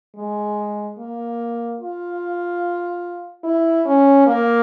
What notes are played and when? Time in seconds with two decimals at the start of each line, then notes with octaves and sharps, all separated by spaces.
0.15 G#3
0.98 A#3
1.80 F4
3.44 E4
3.85 C#4
4.26 A#3